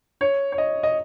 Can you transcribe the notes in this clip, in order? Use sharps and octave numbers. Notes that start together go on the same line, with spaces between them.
C#5
C#5
D#5
D#5